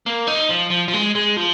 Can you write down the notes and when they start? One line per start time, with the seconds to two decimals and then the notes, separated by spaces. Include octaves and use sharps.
0.06 A#3
0.27 D#4
0.50 F3
0.71 F3
0.88 F3
0.93 G#3
1.15 G#3
1.36 F3